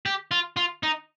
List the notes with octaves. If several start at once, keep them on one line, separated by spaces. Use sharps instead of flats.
G4
F4
F4
D#4